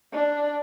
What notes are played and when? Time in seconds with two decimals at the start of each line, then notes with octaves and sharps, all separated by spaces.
0.14 D4